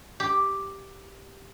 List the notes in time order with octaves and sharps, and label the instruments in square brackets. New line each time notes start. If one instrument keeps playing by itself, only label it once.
[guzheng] G4